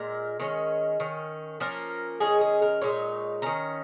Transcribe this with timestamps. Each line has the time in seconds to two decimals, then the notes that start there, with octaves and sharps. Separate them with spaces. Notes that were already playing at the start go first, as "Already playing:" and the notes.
Already playing: A#2 G#3 A#4
0.40 D#3 G#3 C#4
1.00 D#3 C#4
1.60 F3 A#3 C#4 A#4
2.20 D#3 G#3 C#4 G#4
2.41 G#4
2.62 A#4
2.82 A#2 G#3 D#4 C#5
3.42 D#3 C#4 A#5